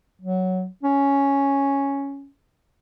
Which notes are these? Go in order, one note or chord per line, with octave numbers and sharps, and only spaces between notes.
F#3
C#4